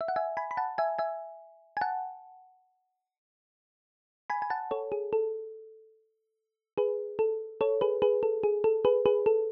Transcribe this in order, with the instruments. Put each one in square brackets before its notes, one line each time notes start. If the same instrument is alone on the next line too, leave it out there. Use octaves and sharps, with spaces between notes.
[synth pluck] E5
F#5
E5 G#5
G#5 B5
B5
F#5 A5
E5 G#5
E5 G#5
G#5
F#5 A5
G#5 B5
G#5
F#5 A5
A4 C#5
G#4
A4
G#4 B4
A4
A4 C#5
G#4 B4
G#4 B4
A4
G#4
A4
G#4 B4
G#4 B4
A4